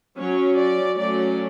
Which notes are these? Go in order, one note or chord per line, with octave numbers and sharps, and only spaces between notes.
F#3 C#4 C#5
D5
F#3 A3 C#4 D5